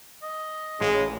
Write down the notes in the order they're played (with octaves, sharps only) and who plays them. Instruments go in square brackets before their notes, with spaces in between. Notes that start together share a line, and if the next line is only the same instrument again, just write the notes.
[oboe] D#5
[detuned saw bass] A1 [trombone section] C#3 [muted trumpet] G#3